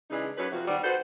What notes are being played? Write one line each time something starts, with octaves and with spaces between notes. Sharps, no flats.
C#3 E3 G#3 D4 D#4 G#4
F#2 B4 C#5
F2 C3 F#4
D#3 G3 B3 C4 F#4 D5
F#4 A4 B4 C5